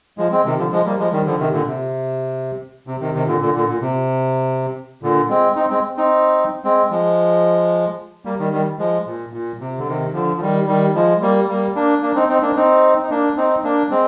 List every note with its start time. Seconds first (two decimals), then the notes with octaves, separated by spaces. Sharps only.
0.18 F3 G#3
0.32 G#3 C4
0.45 C3 D#3
0.59 D3 F3
0.72 F3 G#3
0.85 G3 A#3
0.99 F3 G#3
1.12 D#3 G3
1.26 D3 F3
1.39 C3 D#3
1.52 A#2 D3
1.67 C3
2.87 C3
3.01 C3 D#3
3.14 C3 D#3
3.27 A#2 D3
3.41 A#2 D3
3.55 A#2 D3
3.68 A#2
3.81 C3
5.03 A#2 D3
5.29 G#3 C4
5.56 C4 D#4
5.70 G#3 C4
5.97 C4 D#4
6.64 G#3 C4
6.91 F3 G#3
8.25 G3 A#3
8.40 D#3 G3
8.52 D#3 G3
8.79 F3 G#3
9.06 A#2
9.33 A#2
9.60 C3
9.78 D3
9.87 C3 D#3
10.13 D3 F3
10.36 F3
10.41 D#3 G3
10.67 D#3 G3
10.95 F3 G#3
11.22 G3 A#3
11.49 G3 A#3
11.75 A#3 D4
12.02 A#3 D4
12.15 C4 D#4
12.29 C4 D#4
12.42 A#3 D4
12.56 C4 D#4
13.03 D#4
13.10 A#3 D4
13.37 C4 D#4
13.64 A#3 D4
13.90 G#3 C4